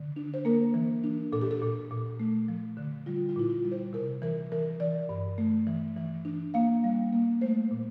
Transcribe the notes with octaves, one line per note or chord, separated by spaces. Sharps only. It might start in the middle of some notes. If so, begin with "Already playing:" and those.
Already playing: D3
D4
C5
A#3 A#4
E3
D4
A#2 A4
G4
A4
A#2
A#2
A3
F3
D3
G3 F4
F4
A#2 E4
F4
G3
C5
C3 A#4
E3 A#4
E3 A#4
E3 D5
G2
A3
E3
E3
D4
A#3 F5
G3
A#3
A3 C5
A#2